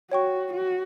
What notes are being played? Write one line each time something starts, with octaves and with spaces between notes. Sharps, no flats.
F#4 C#5 G5 C#6
F#4